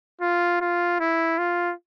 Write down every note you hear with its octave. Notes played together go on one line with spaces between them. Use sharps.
F4
F4
E4
F4